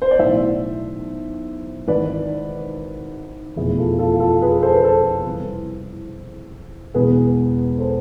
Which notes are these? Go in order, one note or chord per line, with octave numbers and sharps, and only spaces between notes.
C5
D5
B1 A2 E3 C5 E5
G#1 G#2 E3 B4 D5
F1 E2 B2 E4 G#4
F4 A4
F4 A4
F4 A4
G#4 B4
A4 C5
B4
A4 C5
C2 C3 E3
E1 E2 B2 G#4 B4
A4 C5